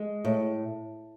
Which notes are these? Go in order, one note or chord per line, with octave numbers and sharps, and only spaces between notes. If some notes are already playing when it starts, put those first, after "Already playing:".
Already playing: G#3
A2